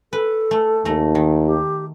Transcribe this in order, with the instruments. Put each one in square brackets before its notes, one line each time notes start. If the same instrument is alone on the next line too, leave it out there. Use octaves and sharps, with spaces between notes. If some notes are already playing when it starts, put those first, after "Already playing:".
[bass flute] A4 [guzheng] B4
[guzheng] A3
[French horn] D#2 [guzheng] A3 A#5
[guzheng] D#3
[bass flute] G4